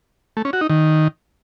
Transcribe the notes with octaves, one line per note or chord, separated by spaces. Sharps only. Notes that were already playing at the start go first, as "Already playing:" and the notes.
A3
C#4
F#4
D#4
D#3